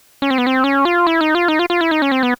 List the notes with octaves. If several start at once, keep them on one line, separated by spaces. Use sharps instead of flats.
C#4
C4
B3
C4
C#4
F4
E4
D#4
F4
D#4
F4
F4
E4
D#4
C#4
C4
B3